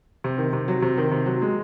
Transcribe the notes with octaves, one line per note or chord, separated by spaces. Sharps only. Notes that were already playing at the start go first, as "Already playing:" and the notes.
C3
D#3
C3
F#3
C3
D#3
C3
F#3
G#3